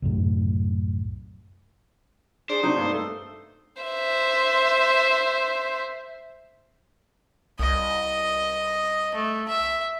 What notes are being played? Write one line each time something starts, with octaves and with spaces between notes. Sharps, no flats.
C2 F#2 A2
D4 G#4 C5
C3 F#3 D4 D#4
G2 A#3
A3 A4
C5 E5
C2 D#5
A3
E5